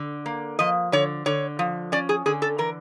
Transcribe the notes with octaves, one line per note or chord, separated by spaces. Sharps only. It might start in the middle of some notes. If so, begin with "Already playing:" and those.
Already playing: D3
A#3
F3 D#5
D3 C#5
D3 C#5
F3
C#4 D5
G#4
D3 G#4
A4
E3 A#4